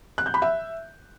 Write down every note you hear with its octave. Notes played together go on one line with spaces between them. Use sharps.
F#6
G6
B5
E5